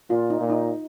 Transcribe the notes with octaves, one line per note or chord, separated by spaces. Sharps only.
A#2 F4
D#4
A#2
D#4